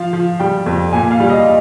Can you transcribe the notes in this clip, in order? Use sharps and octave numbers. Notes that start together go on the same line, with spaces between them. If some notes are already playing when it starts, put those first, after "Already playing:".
Already playing: F3 F5
F3
G3 G5
F2
A#2 G#5
F5
G3
D#5